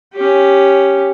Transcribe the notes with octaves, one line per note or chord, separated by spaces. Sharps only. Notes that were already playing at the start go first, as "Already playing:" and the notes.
C#4 G4